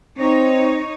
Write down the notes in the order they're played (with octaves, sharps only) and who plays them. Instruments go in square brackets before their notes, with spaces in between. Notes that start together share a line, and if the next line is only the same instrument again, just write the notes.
[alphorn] C4 [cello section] D#4 C#5